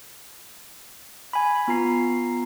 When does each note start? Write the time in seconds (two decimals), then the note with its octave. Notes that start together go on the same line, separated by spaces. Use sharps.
1.33 G#5 B5
1.68 B3 F4 A#5 C7